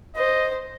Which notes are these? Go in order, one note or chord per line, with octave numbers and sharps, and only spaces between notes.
C5 D#5